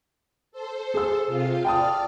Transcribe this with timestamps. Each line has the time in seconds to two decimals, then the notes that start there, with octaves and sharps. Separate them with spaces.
0.52 A4 C5
0.94 G#4 E6
1.27 C3 F4 F5
1.65 D5 G5 A5 D#6 F6